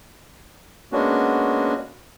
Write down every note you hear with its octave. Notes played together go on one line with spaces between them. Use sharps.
G#3 A#3 B3 C#4 D4 F#4